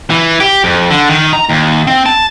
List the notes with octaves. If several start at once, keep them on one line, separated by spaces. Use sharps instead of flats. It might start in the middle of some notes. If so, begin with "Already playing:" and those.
E3
G4
F2
D3
D#3
A#5
D#2
C4
A5